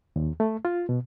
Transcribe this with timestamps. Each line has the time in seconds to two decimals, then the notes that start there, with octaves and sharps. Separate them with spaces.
0.16 D#2
0.40 A3
0.65 F4
0.89 B2